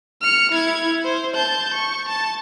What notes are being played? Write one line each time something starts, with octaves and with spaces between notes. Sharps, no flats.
F6 C#7
E4 G#6
C5
A5 G6
C#6
A5